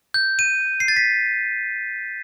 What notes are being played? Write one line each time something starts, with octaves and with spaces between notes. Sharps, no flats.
G6
D#7
C7
A6
B6